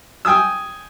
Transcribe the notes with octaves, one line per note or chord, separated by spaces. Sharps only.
G5 G#5 D#6 E6